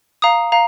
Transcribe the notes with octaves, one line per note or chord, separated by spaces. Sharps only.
F5 A#5 D#6
F5 A#5